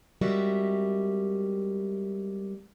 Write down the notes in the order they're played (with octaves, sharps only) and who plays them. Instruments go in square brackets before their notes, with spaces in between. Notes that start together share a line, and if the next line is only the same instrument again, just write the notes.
[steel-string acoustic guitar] G3 G#3 C4 F#4 A#4 E5